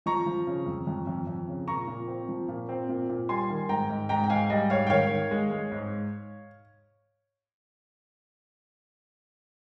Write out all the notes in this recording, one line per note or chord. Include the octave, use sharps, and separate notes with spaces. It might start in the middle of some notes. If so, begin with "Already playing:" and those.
F3 A#5 C#6
F3
C#3
F2
F2
F2
F2
C#3
A#2 A#5 C#6
A#2
C4
F3
A#2
C4
A#2
A#2
G3 G#5 C6
D#3
G#2 G5 A#5
G#2
G#2 G5 A#5
G5
G#2 F5 G#5
G3 D#5 G5
G#2 C#5 F5
G5
D#3 C#5 F5
D#3
G#3
G#3
G#2